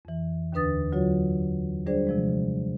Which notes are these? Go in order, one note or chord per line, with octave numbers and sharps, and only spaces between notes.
F2 E3
D#2 D3 D4 B4 D#6 A6
D3 F#3 F4 F#4 C#5
G3 D4 G#4 C5 D5
C3 F3 G#3